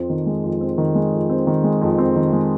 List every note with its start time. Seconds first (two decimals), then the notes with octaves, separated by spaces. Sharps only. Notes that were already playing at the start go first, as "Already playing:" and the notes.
Already playing: F2 C4
0.10 D#3
0.26 G#3
0.44 F2
0.61 C4
0.78 D#3
0.95 G#3
1.13 F2
1.30 C4
1.47 D#3
1.64 G#3
1.82 F2
1.98 C4
2.16 D#3
2.33 G#3